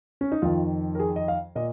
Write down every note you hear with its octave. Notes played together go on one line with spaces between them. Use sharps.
C#4
D#4
F2 D#3 F4
A#4
G#4
D#5
F5
A#2 D#5